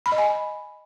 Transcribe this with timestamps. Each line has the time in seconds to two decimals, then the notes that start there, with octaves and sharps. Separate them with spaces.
0.06 B5
0.12 D#5
0.18 G#5